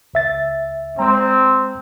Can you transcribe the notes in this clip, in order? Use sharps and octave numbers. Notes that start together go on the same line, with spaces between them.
C#2 E5 A6
G#3 C4 A#5